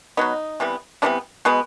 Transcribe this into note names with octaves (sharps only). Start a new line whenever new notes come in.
B2 F#3 B3 D#4
C3 E3 G3 B3
C3 E3 G3 B3 D4
B2 G#3 B3